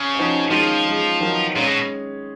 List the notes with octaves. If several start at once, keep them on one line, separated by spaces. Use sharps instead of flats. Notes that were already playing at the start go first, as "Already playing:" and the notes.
Already playing: C#3
F3 B3 D#4 F#4 C#5
D#3 F3 G#3 C#4 F4
C#3 G#3 D#4
D#3 F#3 B3 D#4 A#4
A#2 G#3 C#4 G#4
B2